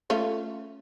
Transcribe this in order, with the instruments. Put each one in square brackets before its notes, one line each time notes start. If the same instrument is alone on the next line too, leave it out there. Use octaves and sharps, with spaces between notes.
[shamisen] A3 C#4 F4